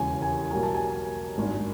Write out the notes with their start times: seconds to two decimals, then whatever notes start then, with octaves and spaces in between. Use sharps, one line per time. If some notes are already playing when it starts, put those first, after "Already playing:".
Already playing: E1 D#2 C#3 E3 G#5
0.22 G#5
0.51 B1 B2 G3 A#3 G#5
0.63 A5
0.75 G#5
1.38 G#1 G2 D#3 F#3